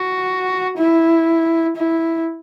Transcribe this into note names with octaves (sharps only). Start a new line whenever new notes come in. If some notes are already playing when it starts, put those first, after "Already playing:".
Already playing: F#4
E4
E4